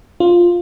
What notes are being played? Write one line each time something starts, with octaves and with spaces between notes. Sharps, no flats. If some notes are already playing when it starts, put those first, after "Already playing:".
F4